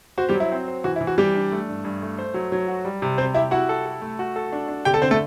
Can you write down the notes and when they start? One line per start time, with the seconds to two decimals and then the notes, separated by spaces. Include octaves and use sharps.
0.18 F#4 C5
0.29 G3 G4
0.34 F#3
0.40 E4
0.52 C4
0.68 C5
0.84 E3 F#4
0.96 E4
1.01 E3
1.07 F#4
1.18 E3 G3 G4
1.35 D4
1.52 A3
1.69 G2
1.84 G2
2.02 A3
2.19 C5
2.34 F#3
2.52 F#3
2.68 F#4
2.85 G3
3.02 C3
3.18 C3 C4 C5
3.34 E4 G4 E5
3.51 E4 F#4 F#5
3.69 A4
3.86 A4
4.02 A3
4.19 F#4
4.36 A4
4.52 D4
4.68 D4
4.85 D3 G4 G5
4.94 A4 A5
5.02 D3 C4 C5
5.11 A3 A4